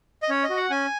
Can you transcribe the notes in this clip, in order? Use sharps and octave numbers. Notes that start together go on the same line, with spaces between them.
D#5
C#4 C#5
D#5
F#4
F#5
C#4 G#5